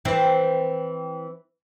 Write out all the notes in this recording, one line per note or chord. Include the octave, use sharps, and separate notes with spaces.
E3 C4